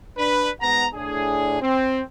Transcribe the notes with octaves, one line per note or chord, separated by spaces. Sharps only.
D4 B4
G#2 G#3 B3 F#5 A#5
A2 D4 G#4
C4